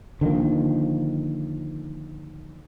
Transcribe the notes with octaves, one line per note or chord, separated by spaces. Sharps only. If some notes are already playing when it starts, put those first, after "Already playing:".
D3 D#3 F3 A#3